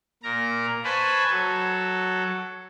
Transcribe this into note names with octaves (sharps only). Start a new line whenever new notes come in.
A#2 A#4 A#5
B4 C5 G#5 A5 B5 C#6
F#3 A4